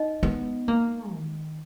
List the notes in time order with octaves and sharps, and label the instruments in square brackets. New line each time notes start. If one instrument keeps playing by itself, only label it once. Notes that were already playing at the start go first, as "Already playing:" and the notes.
Already playing: [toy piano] D#4 D#5
[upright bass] B3
A#3
D#3